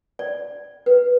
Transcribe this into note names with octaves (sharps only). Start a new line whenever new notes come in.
D5
B4